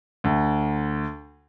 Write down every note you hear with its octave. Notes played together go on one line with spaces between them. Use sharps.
D2